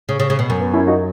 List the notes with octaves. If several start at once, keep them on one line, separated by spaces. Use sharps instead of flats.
C#3
C#3
C#3
B2
F#2
B3
C#4 E4
D#4 F#4